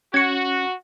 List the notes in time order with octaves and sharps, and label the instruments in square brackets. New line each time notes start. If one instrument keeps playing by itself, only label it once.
[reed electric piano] C#4 [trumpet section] F#4 [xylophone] G#6 C#7